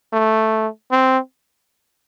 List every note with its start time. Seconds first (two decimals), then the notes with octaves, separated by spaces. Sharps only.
0.13 A3
0.91 C4